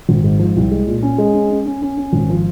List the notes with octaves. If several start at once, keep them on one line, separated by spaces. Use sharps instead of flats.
G#1
G#2
F3
C2
G#3
A#2
C#4
G#3
C#4
C#4
C#4
C#4
C#4
G#1
F3